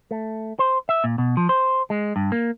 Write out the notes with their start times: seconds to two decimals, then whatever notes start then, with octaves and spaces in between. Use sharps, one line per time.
0.11 A3
0.59 C5
0.89 E5
1.04 A#2
1.18 B2
1.37 F3
1.49 C5
1.90 G#3
2.16 G2
2.32 A#3